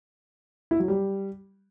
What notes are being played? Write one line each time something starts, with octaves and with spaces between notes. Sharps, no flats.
E4
F#3
G3